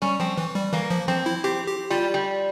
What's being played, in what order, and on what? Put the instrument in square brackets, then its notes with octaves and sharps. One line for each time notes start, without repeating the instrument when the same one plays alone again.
[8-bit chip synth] G3 [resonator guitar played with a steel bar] C#4
[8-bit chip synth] F3 [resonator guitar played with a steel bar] C4
[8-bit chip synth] E3
G3
[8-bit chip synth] E3 [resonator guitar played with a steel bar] A#3
[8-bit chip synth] F3
[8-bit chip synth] F3 [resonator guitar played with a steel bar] C4
[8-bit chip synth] E4
[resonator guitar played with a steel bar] C4 [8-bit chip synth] G4
[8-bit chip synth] G4
[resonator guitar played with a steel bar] G3 [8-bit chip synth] F4
[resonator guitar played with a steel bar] G3